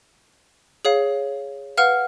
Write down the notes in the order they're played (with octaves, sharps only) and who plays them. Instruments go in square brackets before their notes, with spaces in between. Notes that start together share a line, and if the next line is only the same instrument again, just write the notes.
[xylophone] G#4 C#5 F5
B4 F5 F#5 F6